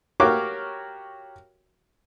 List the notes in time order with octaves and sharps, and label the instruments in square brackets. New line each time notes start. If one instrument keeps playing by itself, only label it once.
[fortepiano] F#4 G4 A#4 C#5 F5 D6